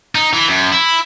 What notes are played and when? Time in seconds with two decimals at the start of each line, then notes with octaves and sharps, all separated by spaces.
0.15 D#4
0.33 E3
0.49 F#2
0.72 E4